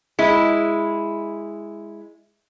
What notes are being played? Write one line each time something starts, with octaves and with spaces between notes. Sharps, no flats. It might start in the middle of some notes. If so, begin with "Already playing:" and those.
G#3 E4